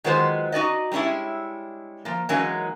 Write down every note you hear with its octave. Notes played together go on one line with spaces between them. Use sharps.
D#3 F#3 G#3 B3 F4 C5
D#4 F#4 D5 D#5
G3 G#3 C#4 D4 E4
F3 A#3
E3 F#3 G#3 A#3 C#4 D#4